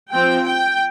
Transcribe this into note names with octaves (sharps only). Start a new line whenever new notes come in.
F3 C4 G5
G5